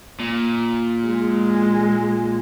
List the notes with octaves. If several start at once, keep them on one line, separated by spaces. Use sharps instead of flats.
A#2
G#3